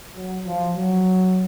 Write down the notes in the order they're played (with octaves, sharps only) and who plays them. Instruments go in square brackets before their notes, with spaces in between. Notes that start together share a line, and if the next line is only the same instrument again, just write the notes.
[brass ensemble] F#3
F3
F#3